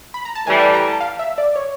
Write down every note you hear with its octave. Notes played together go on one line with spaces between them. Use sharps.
B5
A#5
A5
A2 E3 G3 G#5
A5
A#5
A5
F5
E5
D5
C#5